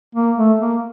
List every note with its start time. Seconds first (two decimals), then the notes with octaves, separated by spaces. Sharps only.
0.15 A#3
0.38 A3
0.60 A#3